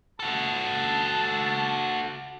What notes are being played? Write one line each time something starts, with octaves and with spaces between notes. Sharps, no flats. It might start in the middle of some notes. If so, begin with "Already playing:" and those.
F#4 A4 A5